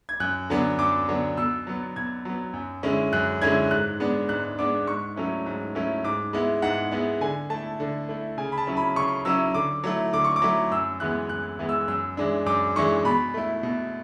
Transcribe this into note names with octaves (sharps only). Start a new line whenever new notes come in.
G#6
F#2 F#6
D3 F#3 B3 D4
F#2 D6
D3 F#3 B3 D4
B2 E6
F#3 B3
B2 G#6
F#3 B3
F#2
D3 G#3 C#4 E4
F#2 F#6
D3 G#3 C#4 E4 G#6
G#2 F#6
G#3 B3 D4
G#2 F#6
G#3 B3 D4 D6
G#2 C#6
F#3 A3 C#4 E4
G#2
F#3 A3 C#4 E4
G#2 D6
G#3 B3 E4
G#2 F#5
G#3 B3 E4
D3 G#5
A3 E4 A5
D3
A3 E4
C#3 G#5
B5
A5
F#3 C#4 E4
B5
C#3 C#6
F#3 C#4 E4 E6
D3 D6
F#3 A3 E4
D3 D6
C#6
D6
F#3 A3 E4
F#2 E6
E3 G#3 B3 F#6
F#2 F#6
E3 G#3 B3
E6
F#2 E6
E3 G#3 D4
F#2 D6
E3 G#3 D4 C#6
B2 B5
A3 E4
B2